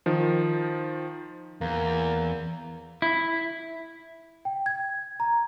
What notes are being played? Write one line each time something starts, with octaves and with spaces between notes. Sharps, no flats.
D#3 F3
E2 A#3
E4
G5
G#6
A#5